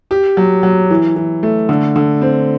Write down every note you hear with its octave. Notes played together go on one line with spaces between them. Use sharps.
G4
F#3
F#3
E3
E3
A3
D3
D3
C4